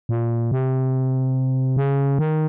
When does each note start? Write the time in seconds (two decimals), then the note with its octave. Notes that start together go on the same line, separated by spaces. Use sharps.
0.09 A#2
0.52 C3
1.77 C#3
2.19 D#3